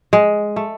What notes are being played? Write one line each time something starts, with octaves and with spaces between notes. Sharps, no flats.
G#3
A3